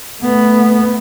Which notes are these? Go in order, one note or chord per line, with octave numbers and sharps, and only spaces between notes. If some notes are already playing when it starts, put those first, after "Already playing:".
A3 B3